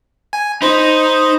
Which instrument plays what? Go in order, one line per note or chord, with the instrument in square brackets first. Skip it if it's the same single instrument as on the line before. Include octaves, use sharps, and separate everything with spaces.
[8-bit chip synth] G#5
[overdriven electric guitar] D#4 [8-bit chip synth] C5 B5